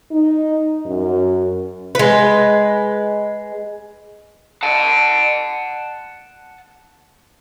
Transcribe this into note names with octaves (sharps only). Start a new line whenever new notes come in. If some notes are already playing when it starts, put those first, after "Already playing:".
D#4
F#2
G#3 B4
F#5 A5